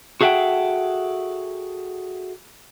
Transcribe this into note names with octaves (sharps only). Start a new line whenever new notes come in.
F#4 G#4 A4 E5 F#5 G5